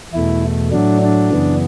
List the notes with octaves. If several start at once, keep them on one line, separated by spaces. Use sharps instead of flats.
E2 B2 A3 E4
A2 F#3 A3 D4
D4
F#2 C#3 E3 B3